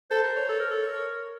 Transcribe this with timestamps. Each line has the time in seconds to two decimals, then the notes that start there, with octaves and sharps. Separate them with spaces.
0.11 A4 C5
0.24 A#4
0.36 C#5
0.49 A4
0.60 A#4
0.71 A4
0.88 A#4